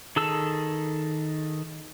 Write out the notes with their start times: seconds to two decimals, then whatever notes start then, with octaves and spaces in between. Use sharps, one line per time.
0.16 D#3 G#4 A4 A5 E6